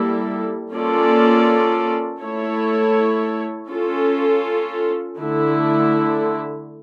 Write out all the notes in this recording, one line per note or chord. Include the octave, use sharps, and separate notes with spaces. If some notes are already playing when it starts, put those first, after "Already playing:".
Already playing: G3 A#3 E4 A4
A#3 C#4 F4 A4 D5
A3 E4 A4 C#5
C#4 F4 A4
D3 A3 E4